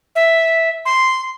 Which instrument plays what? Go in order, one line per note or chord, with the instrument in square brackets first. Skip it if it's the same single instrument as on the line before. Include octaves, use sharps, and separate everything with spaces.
[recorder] E5
C6